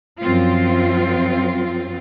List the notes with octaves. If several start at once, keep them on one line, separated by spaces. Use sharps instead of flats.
F#2 F3 C4 F4